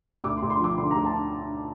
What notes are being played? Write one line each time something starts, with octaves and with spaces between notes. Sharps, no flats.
D2 D6
C6
D2
C6
F3 D6
D3 C6
D2 A#5
A5